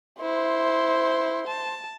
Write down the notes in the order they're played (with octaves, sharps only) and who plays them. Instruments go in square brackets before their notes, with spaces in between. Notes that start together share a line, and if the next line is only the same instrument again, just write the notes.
[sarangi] E4 [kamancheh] C5 C6
[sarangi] A5